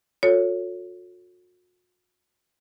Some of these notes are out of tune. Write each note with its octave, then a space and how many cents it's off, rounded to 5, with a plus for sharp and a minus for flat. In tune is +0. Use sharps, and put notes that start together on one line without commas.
F#4 -45 A4 +20 C#5 +5